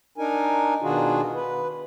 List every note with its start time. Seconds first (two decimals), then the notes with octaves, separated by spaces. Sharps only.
0.18 D4 D#4 A#4 G#5
0.82 B2 D#3 D4 F4 F#4 G#4
1.34 B4